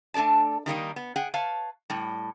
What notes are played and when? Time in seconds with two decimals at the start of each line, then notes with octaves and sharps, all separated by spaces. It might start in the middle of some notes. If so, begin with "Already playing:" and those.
0.14 A3 D4 A4 D5 A5
0.66 D#3 G3 A#3 D#4
0.96 B3
1.16 G#4 F#5 G5
1.34 B4 C#5 F5 A5
1.90 A2 G3